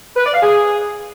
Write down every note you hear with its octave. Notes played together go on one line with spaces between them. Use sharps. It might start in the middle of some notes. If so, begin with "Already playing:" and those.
B4
D5
F5
G#4